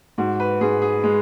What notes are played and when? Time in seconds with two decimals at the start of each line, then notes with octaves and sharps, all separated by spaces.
0.18 G#2 F#4
0.40 B4
0.61 G#2 G#4
0.82 G#4
1.03 G#3